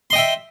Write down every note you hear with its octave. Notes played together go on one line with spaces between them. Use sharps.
D#5 E5 G5 C6